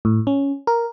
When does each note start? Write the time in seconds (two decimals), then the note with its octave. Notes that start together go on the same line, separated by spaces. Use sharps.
0.05 A2
0.27 C#4
0.67 A#4